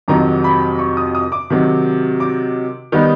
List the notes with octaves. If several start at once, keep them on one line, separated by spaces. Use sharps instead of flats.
F2 C3 D#3 F#3 A#5
B5
C#6
D#6
D#6
D6
C3 D#3 F#3
D6
D#3 G3 B3 D#4